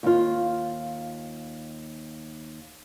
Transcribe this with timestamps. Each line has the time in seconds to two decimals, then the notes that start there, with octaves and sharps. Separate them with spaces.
0.03 D#2 F4